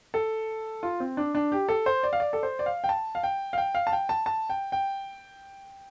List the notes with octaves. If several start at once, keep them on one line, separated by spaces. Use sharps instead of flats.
A4
F4
C4
D4
D4
G4
A4
C5
D5
F5
D5
A4
C5
D5
F5
G5
A5
F5
G5
F5
G5
F5
A5
G5
A5
A5
G5
G5